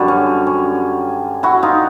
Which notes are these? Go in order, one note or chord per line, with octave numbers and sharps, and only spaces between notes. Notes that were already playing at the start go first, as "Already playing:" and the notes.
Already playing: F#2 D3 G3
C#4
C#4
E4 F#4
D#4 F4